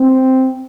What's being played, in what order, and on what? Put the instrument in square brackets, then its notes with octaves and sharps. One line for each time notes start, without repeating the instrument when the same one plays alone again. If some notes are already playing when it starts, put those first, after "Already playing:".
Already playing: [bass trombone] C4